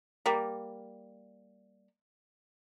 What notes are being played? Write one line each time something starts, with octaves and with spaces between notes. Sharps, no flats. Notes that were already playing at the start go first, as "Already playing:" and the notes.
G3 A#3